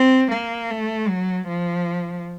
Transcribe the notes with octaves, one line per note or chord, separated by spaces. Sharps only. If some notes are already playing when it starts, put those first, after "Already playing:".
Already playing: C4
A#3
A3
F#3
F3